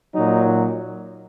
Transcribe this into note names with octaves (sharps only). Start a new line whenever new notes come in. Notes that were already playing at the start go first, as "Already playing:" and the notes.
A#2 F#3 D#4